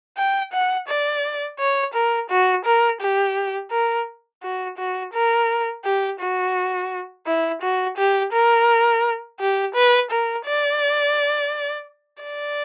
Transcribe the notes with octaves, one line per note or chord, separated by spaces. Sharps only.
G5
F#5
D5
C#5
A#4
F#4
A#4
G4
A#4
F#4
F#4
A#4
G4
F#4
E4
F#4
G4
A#4
G4
B4
A#4
D5
D5